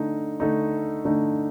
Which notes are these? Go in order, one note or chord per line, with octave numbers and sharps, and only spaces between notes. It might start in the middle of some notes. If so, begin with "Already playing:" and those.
Already playing: D3 A3 D#4
D3 A3 D#4
D3 A3 D#4